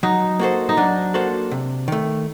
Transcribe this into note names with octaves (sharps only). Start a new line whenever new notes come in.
F#3 D#4
A#3 F#4 A4 C5
D#4
F#3 D4
A#3 F#4 A4 C5
C3
D#3 A3